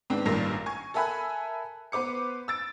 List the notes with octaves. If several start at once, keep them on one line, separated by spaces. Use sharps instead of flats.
G#2 B3 C4 D4
A1 G2 A#2 D#3 A#6 C7
G#5 C#6 G#6
A4 A#4 E5 G#5 B5 F#6
B3 B4 C5 D6 C#7
E6 A6 D7